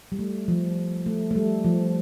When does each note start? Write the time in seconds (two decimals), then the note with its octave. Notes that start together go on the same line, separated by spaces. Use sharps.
0.12 G3
0.19 A3
0.48 F3
1.06 A3
1.31 A3
1.36 G3
1.65 F3